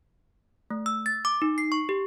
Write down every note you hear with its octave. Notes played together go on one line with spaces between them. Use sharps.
A3
E6
A6
D6
D#4
C7
C#6
G4